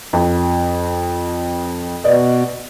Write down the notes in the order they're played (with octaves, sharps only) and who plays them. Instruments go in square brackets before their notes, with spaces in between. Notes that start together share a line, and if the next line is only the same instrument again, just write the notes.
[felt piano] F2
[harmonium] B2 [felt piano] B4 D5 D#5